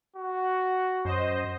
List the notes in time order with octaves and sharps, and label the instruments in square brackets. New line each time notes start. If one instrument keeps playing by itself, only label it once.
[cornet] F#4
[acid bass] F#2 [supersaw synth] C5 D#5